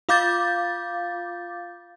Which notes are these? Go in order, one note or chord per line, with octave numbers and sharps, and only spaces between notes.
F4 F5 D6 G6 A6